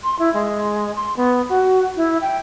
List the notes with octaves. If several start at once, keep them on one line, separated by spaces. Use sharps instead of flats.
C6
E4
G#3
C6
B3
F#4
E4
G5